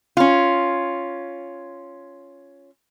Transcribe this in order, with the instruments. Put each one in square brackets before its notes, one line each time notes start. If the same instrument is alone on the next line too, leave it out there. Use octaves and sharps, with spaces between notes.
[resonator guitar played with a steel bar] C#4 F4